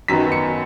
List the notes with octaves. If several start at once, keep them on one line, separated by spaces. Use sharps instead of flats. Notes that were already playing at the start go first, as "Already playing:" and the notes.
F#2 D#3 F#3 B3 D#4 B6
C#7